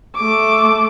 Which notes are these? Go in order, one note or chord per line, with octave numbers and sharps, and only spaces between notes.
A3 D6